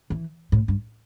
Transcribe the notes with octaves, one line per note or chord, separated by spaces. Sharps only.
E3
A2
G2